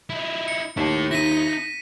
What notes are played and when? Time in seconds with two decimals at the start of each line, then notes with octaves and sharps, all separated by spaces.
0.10 D#4 E4
0.48 C#7
0.77 D#2 E4 A5
1.11 D#4 E4 A#6 B6 D#7